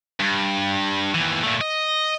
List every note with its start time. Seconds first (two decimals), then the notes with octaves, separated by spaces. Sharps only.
0.20 G2
1.15 D#2 E3
1.43 A#2 A3
1.61 D#5